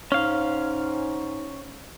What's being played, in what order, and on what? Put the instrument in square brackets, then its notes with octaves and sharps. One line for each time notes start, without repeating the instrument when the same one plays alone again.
[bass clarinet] G#2 [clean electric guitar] C#4 F5